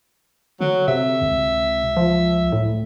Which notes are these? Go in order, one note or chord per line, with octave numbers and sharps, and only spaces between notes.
D3 F#3
C3 E5
C#2
F3
A2